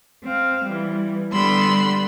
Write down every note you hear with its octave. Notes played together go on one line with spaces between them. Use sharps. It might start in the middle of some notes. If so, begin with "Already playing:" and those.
C4 F5
E3 G3
D3 G3 B3 B5 C6 E6